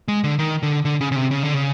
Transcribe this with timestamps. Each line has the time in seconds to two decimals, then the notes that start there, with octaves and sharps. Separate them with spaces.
0.08 G#3
0.24 D3
0.39 D#3
0.63 D3
0.85 D3
1.01 C#3
1.12 C#3
1.16 C3
1.31 C#3
1.43 D3
1.54 C#3